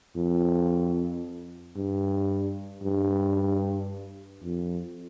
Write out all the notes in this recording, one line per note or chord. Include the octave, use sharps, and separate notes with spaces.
F2
G2
G2
F2